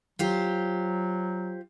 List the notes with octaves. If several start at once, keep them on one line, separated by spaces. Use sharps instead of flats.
F#3 F4 G4 C5